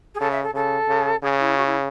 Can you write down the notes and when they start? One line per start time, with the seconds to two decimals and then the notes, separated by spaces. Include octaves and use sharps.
0.15 G#4
0.20 C#3 A4
0.31 E5
0.44 A4
0.54 C#3 A4
0.89 C#3
1.23 C#3 G#4
1.40 E4
1.57 F#4
1.66 E4